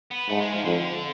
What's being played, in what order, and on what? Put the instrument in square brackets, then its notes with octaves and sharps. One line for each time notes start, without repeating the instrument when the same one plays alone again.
[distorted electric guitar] B3
[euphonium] G#2 [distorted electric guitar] A3
[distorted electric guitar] G#3
F3
[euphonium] F2 [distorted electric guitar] D3